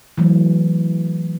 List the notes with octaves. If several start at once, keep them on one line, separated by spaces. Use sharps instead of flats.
E3 F#3 A3